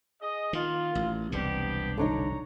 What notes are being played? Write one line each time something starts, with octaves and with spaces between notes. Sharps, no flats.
G#4 D#5
D#3 A#3 F4
A1
E1 C2 C3 B3 D4 G4
D3 F#3 D4 D#4 C#5 A#5